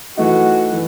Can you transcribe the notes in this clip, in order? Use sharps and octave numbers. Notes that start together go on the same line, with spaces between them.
E3 A3 D#4 F#4
E3